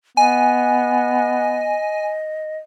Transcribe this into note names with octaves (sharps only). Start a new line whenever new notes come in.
B3 D#5 G#5